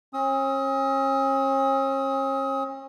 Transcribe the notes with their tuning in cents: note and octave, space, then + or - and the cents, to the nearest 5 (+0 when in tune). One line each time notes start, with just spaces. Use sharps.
C#4 -40 D#6 +30